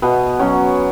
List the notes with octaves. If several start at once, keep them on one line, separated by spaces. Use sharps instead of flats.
B2 B3
F#3 C#4